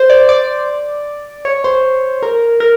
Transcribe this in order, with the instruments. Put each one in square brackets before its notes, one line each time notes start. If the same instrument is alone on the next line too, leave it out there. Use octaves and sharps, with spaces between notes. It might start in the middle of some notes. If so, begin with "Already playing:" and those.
Already playing: [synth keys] C5
D5
D5
C#5
C5
A#4
A#4